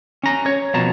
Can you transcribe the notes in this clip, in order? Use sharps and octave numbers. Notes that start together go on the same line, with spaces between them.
C#4 A#5
C#5
F2 B2 A5 A#5